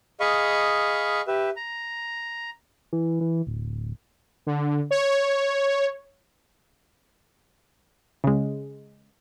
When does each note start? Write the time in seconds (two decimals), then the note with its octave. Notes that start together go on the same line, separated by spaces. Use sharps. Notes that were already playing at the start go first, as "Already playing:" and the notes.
0.20 G#4 D#5 F5 B5 C#6
1.27 G4 B4 E5
1.56 A#5
2.93 E3
3.21 E3
3.47 D1
4.46 D3
4.91 C#5
8.24 C#3 G#3